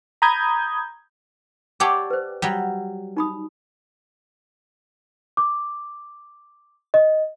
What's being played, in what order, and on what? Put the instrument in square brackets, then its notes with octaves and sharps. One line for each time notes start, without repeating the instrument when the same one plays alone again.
[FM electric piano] A#5 B5 D#6 G6 G#6
[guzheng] G4 C#5 D5 [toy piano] F#5 A5 E6
[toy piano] B4 C5
[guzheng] F#3 G3
[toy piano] D#4 B5 D#6
[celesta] D6
D#5